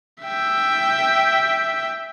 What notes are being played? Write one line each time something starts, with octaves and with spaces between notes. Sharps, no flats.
E5 G5